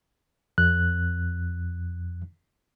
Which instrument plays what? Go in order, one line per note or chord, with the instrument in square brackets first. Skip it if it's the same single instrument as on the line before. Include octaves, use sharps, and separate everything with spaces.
[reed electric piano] F2 F#6